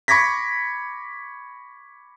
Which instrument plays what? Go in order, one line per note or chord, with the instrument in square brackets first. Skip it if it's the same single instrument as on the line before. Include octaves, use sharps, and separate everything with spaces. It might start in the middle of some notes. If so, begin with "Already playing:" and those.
[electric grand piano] B5 C#6 D6 G#6 A#6 B6